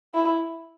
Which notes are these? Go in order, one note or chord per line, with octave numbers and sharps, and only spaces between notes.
E4